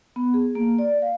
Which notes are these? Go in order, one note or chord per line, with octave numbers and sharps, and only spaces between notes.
B3
G#4
A#3
D5
F5